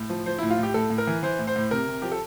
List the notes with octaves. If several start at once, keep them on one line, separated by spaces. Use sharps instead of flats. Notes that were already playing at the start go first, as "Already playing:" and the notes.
Already playing: A2
F3
F3 C5
E4
A2
F4
A2
G4
A2 A4
A2
A#4
E3
E3 C5
A2
C5
A2
C3 A#4
C3
F3 G4
A4